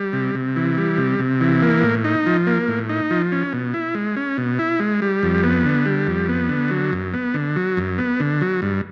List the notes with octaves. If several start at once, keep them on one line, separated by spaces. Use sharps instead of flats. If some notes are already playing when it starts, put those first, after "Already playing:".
Already playing: G3
C3
C3
E3
G3
C3
C3
E3
A#3
A2
D#4
F3
A#3
A2
D#4
F3
C#4
B2
E4
G#3
C#4
B2
E4
G#3
G3
F2
B3
D3
G3
F2
B3
D3
F#3
F#2
B3
D3
F#3
F#2
B3
D3
F#3
G2